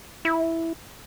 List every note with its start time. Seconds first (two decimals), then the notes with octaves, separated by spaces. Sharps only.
0.25 E4